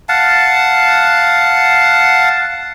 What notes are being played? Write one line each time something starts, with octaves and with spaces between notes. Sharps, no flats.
F5 F#5 A5